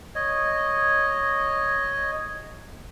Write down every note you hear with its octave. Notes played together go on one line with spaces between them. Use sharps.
C#5 D#5